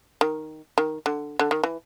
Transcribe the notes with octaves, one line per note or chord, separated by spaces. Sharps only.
D#3
D#3
D3
D3
D#3
E3